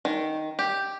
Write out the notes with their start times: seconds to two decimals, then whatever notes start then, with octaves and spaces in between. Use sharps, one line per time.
0.05 D#3
0.59 G4